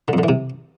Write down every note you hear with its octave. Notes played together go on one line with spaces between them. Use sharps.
D3
F2
D3
E3
C3